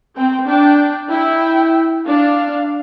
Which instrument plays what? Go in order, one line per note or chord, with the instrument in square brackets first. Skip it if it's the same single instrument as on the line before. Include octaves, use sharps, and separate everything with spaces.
[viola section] C4 [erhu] G5
[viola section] D4 [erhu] G5
[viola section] E4 [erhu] G5
[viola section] D4 [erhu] F5